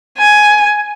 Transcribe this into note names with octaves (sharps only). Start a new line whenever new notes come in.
G#5